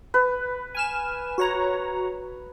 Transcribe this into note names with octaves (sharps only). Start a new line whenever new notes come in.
B4
G#5 F6 E7
F#4 C#5 A#5